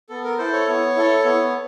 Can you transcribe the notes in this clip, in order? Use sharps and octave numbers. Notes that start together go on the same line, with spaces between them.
B3 A4
A#4
E4 A4 C5
C#5
B3
E4 A4
B3